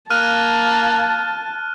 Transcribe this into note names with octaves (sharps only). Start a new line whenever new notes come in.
A#3 A5 F6 F#6 D#7